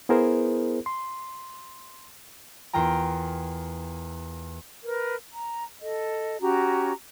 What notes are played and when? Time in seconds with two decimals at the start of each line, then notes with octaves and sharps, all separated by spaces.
0.09 B3 E4 G#4 A#4 C5
0.86 C6
2.73 E2 F4 A#4 G5 A#5
4.85 A#4 B4
5.33 A#5
5.81 A4 D#5
6.41 C#4 F#4 G4 A#5